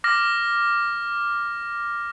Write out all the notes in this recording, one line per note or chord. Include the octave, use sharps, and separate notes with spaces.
D6 F6 A#6